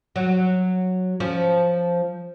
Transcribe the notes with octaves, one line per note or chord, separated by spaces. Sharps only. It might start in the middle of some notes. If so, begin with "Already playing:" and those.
F#3
F3 C#4